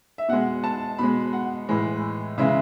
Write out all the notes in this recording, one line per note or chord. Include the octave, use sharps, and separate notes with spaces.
E5
B2 G#3 F#5
A5
B2 G#3 B5
F#5
A2 E3 G#3
C#3 E3 G#3 E5